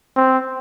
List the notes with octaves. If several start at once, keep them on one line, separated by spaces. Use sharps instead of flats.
C4